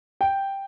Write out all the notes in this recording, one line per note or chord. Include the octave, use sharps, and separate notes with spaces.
G5